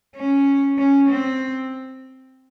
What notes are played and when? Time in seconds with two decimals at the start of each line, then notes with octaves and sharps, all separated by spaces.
0.16 C#4
0.78 C#4
1.09 C4